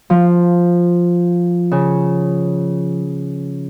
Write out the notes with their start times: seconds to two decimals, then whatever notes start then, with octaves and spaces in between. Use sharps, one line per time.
0.10 F3
1.72 C#3